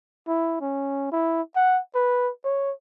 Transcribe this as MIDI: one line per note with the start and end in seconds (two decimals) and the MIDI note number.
0.28 0.56 64
0.61 1.09 61
1.12 1.42 64
1.56 1.80 78
1.95 2.30 71
2.45 2.72 73